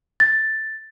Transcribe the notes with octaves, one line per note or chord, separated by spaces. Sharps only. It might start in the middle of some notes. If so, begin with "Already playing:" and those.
A6